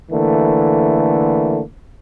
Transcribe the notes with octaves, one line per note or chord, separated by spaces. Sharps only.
D3 E3 A3 A#3